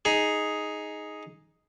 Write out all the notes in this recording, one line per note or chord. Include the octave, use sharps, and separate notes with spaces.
D#4 G#4